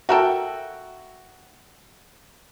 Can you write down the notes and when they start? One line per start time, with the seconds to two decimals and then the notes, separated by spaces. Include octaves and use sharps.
0.09 F#4 A4 A#4 E5 G5